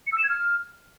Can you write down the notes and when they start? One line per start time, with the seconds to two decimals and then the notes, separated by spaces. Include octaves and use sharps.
0.07 C#7
0.12 E6
0.18 E7
0.24 G#6
0.29 F6